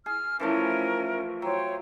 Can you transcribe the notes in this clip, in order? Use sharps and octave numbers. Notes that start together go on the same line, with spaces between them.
G#4 F6
E3 F3 A3 C#4 A#4
F#3 C5 C#5 G5